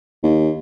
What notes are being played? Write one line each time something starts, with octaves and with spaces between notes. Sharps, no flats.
D#2